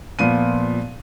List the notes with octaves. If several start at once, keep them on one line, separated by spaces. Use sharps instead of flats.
A#2 F3 B3 D#7